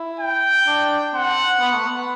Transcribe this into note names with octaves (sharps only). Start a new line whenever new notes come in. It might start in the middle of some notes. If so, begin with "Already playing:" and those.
Already playing: E4
G5
D4
C4 F#5
B3
A3
B3